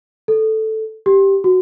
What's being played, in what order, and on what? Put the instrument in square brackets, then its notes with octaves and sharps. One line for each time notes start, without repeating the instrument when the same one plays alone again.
[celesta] A4
G4
F#4